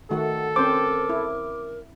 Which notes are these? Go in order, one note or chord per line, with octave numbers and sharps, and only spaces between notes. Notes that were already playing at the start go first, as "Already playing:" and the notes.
D#3 A3 F#4 A4 F#5
C4 C#4 A#4 C5 D6
E4